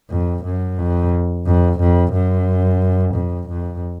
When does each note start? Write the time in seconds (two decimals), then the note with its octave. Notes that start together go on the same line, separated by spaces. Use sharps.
0.10 F2
0.44 F#2
0.78 F2
1.46 F2
1.80 F2
2.13 F#2
3.14 F2
3.49 F2